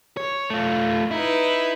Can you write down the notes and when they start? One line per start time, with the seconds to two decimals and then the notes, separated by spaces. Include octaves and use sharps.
0.17 C#5
0.50 A3 F4
1.11 D#4 E4 B4